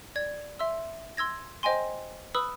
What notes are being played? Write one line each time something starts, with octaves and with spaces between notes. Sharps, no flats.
D5 G#6
E5 C6 E6
C6 E6 G#6 A#6
C5 D#5 G5 G#5 C6
B4 B5 D#6 E6 F#6